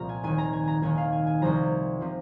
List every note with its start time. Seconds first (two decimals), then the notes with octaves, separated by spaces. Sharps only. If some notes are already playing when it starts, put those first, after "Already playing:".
Already playing: C2 A#2 F3 F5 A#5
0.09 G#5
0.23 D#2 D#3 G#5
0.38 A#5
0.53 G#5
0.68 A#5
0.82 D#2 D#3 G#5
0.98 F5
1.12 G#5
1.27 G#5
1.41 C2 C3 F3 A#5
2.01 C3 F3